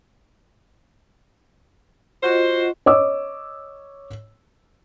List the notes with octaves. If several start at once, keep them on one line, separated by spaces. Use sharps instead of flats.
F4 F#4 C5 D#5
C#5 D#5 D6 E6